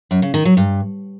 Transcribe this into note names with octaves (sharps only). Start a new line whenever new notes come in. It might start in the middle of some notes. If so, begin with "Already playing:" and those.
F#2
C#3
D#3
F#3
G2